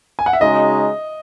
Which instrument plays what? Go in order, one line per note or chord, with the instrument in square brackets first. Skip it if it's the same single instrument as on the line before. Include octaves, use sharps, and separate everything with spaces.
[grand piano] G#5
F#5
E5
[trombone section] C#3 G#3 D#4 F#4 [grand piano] D#5